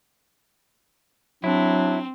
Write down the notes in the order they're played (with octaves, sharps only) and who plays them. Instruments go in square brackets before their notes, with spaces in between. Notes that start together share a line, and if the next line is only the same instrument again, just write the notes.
[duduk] F#3 [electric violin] C4 [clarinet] D4 [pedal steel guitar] E4